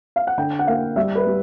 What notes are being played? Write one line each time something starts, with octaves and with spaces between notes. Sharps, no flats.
F5
F#5
D3 G5
F#5
A#3 F5
G3 E5
B4
G3